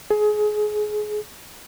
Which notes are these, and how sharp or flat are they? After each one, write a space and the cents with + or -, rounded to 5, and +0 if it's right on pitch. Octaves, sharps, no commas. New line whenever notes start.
G#4 +25